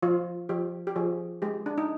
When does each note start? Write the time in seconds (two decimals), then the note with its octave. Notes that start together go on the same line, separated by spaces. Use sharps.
0.02 F3 F4
0.49 F3 G4
0.87 G4
0.96 F3 G#4
1.42 G#3 G4
1.66 D4
1.78 D#4